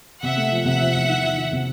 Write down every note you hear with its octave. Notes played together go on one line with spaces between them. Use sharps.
C3 E5 F#5
A3
F3
C3 E5 F#5
F3
E2
D#3
D#3
D#3
C3